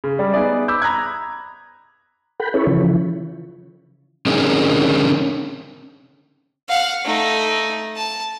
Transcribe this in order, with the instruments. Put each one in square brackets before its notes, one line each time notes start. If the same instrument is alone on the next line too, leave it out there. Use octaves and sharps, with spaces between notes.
[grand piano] C#3
G3 G#3
B3 D#4 G#4 D5 E5
B5 D6 E6 G6
A#5 B5 D#6 F#6 G#6
[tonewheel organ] A4 A#4 F#5 G5 B5
C#4 E4 G#4 A4 B4 C#5
C#3 E3 F3
[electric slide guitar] D3 C4 C#4 D#4 G#4 A#4
[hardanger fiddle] F5 F#5
A3 D#4
A5